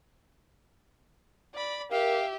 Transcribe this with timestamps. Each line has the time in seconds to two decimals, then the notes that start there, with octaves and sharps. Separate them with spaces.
1.54 D5 B5
1.91 G4 A#4 E5 F5